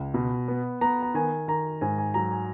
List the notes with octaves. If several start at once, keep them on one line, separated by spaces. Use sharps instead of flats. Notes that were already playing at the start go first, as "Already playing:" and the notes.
Already playing: C#2
B2
B3
B3 A#5
A#5
D#3 G#5
D#3 A#5
G#2 G#5
G#5
F#3 A#5
G#5